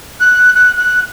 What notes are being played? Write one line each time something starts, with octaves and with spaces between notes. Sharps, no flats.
F#6
F#6
F#6